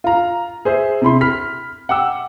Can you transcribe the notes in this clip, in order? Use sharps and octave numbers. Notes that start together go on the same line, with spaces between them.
F4 A#5
G#4 C5 E5
C3 E4 B5 C6
B5 F6 B6
F#5 G5 D6 E6